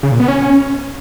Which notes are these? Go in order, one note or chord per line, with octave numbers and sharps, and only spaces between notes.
C#3
A#2
B3
C#4